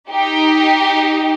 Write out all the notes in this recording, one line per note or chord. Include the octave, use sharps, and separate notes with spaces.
D#4 G4